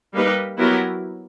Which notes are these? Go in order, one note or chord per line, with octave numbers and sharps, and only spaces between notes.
G3 A#3 D#4 G4 B4
F#3 B3 E4 G4 A#4